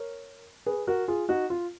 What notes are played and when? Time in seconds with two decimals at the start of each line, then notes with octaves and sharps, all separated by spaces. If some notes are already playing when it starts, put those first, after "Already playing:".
Already playing: A#4 C#5
0.66 G#4 B4
0.87 F#4 A#4
1.08 F4 G#4
1.29 D#4 F#4
1.50 F4